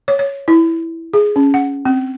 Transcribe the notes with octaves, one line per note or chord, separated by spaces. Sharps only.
C#5
C#5
E4
G#4
C#4
F#5
C4